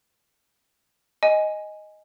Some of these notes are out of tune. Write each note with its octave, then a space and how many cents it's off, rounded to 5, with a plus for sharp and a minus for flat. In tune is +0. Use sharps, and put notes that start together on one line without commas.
D#5 +0 G#5 +0